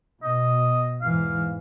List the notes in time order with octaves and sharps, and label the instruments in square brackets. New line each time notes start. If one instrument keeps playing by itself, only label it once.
[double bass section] B2 [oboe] D#5
[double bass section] E2 G#2 E3 [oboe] F5